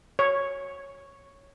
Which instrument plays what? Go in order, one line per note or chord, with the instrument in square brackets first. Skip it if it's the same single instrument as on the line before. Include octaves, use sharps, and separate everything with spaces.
[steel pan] C#5